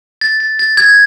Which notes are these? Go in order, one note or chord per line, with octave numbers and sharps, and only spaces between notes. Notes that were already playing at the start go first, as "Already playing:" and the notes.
A6
A6
A6
G#6